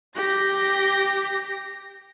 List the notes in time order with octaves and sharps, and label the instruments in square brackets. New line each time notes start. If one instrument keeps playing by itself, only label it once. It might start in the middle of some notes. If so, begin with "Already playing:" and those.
[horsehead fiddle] G4 [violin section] A#6